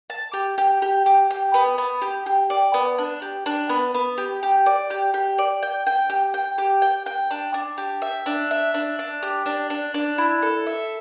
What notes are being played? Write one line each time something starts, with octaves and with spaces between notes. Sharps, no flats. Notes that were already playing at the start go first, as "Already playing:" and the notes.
A5
G4
G4
G4
G4
G4
B3
B3
G4
G4
D5
B3
D4
G4
D4
B3
B3
G4
G4
D5
G4
G4
D5
G5
G5
G4
G5
G4
G5
G5
D4
D4
G4
E5
D4
E5
D4
D4
G4
D4
D4
D4
E4
A4
E5